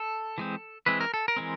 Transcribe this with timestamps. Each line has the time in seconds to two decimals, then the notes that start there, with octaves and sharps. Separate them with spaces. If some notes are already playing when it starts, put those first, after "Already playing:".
Already playing: A4
0.38 E3 G#3 C4
0.86 E3 G#3 C4 B4
1.01 A#4
1.14 A4
1.28 A#4
1.36 E3 G#3 C4